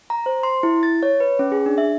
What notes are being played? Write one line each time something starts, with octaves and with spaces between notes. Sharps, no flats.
A#5
C5
C6
E4
A6
C#5
B4
C#4
G#4
D4
E5